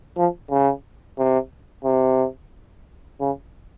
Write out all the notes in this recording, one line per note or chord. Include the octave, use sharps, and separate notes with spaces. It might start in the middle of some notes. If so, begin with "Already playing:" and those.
F3
C#3
C3
C3
C#3